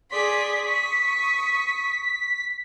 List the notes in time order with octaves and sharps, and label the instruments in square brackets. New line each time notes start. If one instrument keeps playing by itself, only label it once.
[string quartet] G#4 D5 C6 [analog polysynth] B6
[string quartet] C#6 D#6